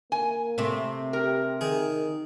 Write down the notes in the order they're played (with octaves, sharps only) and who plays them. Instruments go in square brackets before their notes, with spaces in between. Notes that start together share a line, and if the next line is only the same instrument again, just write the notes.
[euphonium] A#3 [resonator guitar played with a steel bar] G#5
[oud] C3 A3 C4
[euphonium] G4 [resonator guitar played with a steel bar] A#4
[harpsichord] D#3 G#4 [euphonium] D#4